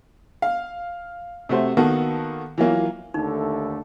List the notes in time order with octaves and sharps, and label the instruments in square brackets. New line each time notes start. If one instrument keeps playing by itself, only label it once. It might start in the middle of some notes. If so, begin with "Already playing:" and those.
[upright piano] F5
C3 A3 F#4 C5
D#3 A#3 B3 F#4 A4
E3 F#3 A#3 F4
[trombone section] D#2 D3 A3 [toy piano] D#4